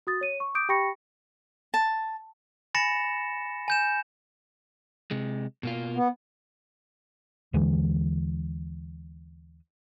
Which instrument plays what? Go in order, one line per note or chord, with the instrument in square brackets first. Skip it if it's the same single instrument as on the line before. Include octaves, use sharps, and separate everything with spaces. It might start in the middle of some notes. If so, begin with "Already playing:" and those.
[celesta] F#4 D#6 A6
C#5 D#7
C#6
D6 D#6 G6 D7
G4 G5 B5 C#6 A#6 C#7
[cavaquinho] A5
[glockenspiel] G#5 B5 A6 A#6 C#7 E7
G#5 G6 E7
[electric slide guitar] C3 G#3
B2 A#3 F4
[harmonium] B3
[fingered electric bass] D#2 D3 E3 G#3